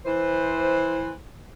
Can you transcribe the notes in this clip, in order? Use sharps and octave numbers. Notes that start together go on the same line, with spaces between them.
E3 C5